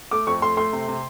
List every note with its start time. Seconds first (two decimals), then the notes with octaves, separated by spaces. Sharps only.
0.11 A3 D6
0.27 F2 C#6
0.42 A3 C6
0.57 A3 C6
0.73 C3
0.88 C3